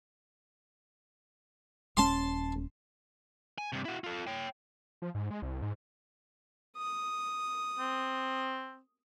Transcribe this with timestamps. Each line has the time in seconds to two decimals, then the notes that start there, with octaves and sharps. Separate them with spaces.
1.97 D#1 C#4 A5 C6
3.58 G#5
3.73 G2 C3
3.85 E4 F#4
4.04 F4 A4
4.27 C#5 G5
5.02 F3
5.15 G#2
5.31 G#3
5.42 C2
5.62 G#2
6.77 D#6
7.79 C4